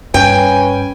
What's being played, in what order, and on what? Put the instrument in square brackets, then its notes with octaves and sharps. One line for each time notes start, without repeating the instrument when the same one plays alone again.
[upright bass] G2 [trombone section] C#4 B4 [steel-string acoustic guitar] G5 [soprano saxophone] G#5